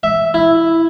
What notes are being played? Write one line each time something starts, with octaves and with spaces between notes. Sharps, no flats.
E5
E4